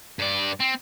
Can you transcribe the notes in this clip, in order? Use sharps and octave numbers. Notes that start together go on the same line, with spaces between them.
G2 D5
C4